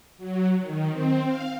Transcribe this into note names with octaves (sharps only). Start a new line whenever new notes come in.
F#3
D#3
C4
F5